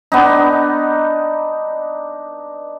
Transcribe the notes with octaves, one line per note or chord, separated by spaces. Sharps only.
B3 D4 D#4